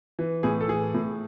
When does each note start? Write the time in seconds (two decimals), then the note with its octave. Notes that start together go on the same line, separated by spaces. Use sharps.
0.19 E3
0.43 A2 G#4
0.61 A4
0.68 E3 G#4
0.94 A2